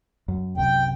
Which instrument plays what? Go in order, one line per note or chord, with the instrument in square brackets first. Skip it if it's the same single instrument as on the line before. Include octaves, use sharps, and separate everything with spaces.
[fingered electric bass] F#2
[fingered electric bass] C2 F#2 C3 [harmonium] G5